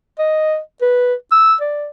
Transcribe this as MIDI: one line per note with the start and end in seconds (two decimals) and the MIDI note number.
0.19 0.59 75
0.82 1.14 71
1.31 1.55 88
1.61 1.88 74